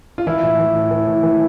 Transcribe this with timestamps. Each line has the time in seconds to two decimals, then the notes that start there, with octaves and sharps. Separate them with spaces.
0.18 F4
0.27 E3 E4
0.43 A2
0.59 E3
0.75 A2
0.91 E3
1.07 A2
1.23 E3